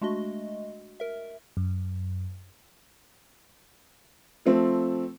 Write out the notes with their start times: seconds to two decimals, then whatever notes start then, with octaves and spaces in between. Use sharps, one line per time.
0.01 G#3 A3 D4 F#4 D#5
1.00 A#4 E5
1.57 F#2
4.45 F3 A3 C4